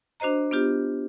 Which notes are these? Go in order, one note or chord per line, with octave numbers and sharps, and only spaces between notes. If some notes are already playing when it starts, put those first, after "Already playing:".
D4 F#4 C5 D#5 A#5
B3 D4 F4 G4